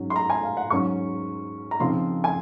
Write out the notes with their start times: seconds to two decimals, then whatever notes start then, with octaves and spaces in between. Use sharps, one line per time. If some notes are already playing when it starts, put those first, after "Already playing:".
Already playing: G#2 F#3 C#4
0.10 C6
0.16 A#5
0.30 G#5
0.43 F5
0.57 F#5
0.70 G#2 F#3 C#4 C#6
1.71 A#5
1.79 C#3 F3 C4 D#4 C6
2.24 G#5